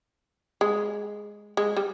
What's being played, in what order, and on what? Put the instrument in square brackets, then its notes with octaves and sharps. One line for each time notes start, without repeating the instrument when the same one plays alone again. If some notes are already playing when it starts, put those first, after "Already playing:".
[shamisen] G#3
G#3
G3